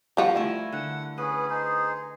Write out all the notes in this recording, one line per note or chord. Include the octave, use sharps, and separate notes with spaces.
F3 G3 F4 F#4 A#5
A3 E4 A#4 G#5
D3 F#5
B3 C#4 G#4 B4
D#4 G#4 C5